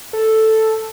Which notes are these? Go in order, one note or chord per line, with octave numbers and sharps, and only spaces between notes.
A4